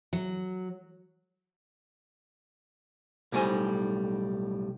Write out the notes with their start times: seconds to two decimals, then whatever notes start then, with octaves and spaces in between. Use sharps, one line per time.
0.13 F#3
3.32 B1 A2 G3 C5 G#5